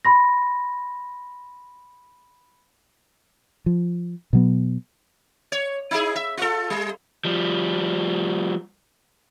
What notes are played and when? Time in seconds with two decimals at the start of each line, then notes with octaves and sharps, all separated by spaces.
0.05 B5 C6 A#6
3.66 F3
4.33 B2 F#3 B3
5.52 C#5
5.91 D#4 E4 G#4
6.16 E5
6.37 F4 A4
6.70 G3
7.25 F3 G3